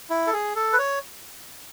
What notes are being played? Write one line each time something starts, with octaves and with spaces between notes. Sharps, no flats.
E4
A4
G#4
A4
B4
C#5